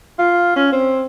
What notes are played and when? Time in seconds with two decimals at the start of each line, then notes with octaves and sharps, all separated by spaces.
0.19 F4
0.56 C#4
0.72 C4